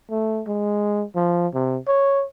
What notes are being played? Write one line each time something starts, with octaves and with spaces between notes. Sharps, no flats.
A3
G#3
F3
C3
C#5